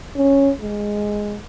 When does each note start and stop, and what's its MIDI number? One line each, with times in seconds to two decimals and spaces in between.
0.16 0.50 61
0.61 1.37 56